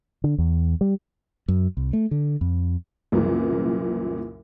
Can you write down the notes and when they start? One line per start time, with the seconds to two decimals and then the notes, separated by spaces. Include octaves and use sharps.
0.24 D3
0.38 E2
0.81 G3
1.48 F#2
1.77 C2
1.93 A3
2.11 D3
2.41 F2
3.12 C2 F#2 A#2 C#3 E3